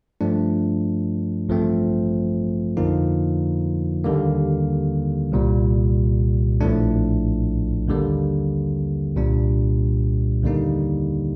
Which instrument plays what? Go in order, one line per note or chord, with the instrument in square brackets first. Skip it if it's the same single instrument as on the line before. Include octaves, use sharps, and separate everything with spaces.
[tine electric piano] G2 F3 A3 D4
A1 G2 F3 A3 C4
F2 D3 F3 A#3 D#4
D#2 D3 G3 A#3
C2 A#2 G3
A#1 A2 F3 A3 D4
D#2 D3 G3 A#3
C2 A#2 G3 D4
D#2 D3 G3 A#3 D#4